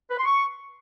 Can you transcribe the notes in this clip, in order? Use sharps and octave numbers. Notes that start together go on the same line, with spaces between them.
B4
C6
C#6